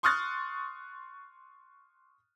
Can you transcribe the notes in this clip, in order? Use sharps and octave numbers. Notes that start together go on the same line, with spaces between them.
C6 C#6 D#6 F6 F#6 A6